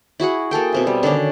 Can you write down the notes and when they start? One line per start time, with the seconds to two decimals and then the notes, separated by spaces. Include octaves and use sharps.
0.20 E4 F#4 G#4 F#5
0.51 A#3 G#4 A4 G5
0.72 B2 C4 E5
0.87 G3
1.03 D3 D#3 C#4 D5